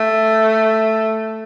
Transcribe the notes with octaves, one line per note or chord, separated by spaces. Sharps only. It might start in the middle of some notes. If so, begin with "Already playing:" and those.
Already playing: A3